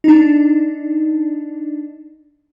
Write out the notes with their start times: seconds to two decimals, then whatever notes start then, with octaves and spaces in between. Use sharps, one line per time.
0.04 D4 D#4